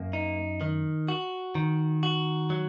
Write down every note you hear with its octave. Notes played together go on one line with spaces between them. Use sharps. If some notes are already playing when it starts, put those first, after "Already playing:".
Already playing: F#2 A#3
D#4
D#3
F#4
D#3
F#4
F#3